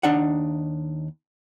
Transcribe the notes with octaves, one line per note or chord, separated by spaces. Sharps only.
D#2 D4 D#4 F#5